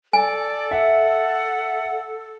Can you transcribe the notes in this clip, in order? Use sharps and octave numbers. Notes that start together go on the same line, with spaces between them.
A4 D5 G#5
E5 F#5